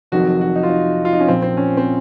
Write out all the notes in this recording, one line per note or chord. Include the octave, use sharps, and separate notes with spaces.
F1 F2 D#3 F#3 F#4
F#4
D#4
F4
D#4
F4
D#4
C#4
A#1 A#2 F3 C4
C4
C#4
C4